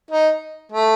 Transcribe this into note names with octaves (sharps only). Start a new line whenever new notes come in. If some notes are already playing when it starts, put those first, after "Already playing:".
D#4
A3